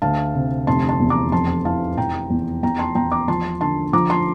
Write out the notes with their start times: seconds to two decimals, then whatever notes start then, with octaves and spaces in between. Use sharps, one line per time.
0.02 D2 F5 A5
0.35 C3
0.67 F1 A5 C6
0.89 A5 C6
1.00 E2
1.10 A#5 D6
1.32 F2 A5 C6
1.65 E3 F5 A5
1.97 F1 G5 A#5
2.30 E2
2.63 E2 G5 A#5
2.79 A5 C6
2.95 E2 G5 A#5
3.12 A#5 D6
3.28 F3 A5 C6
3.61 D3 A5 C6
3.93 F3 A#5 D6
4.10 A5 C6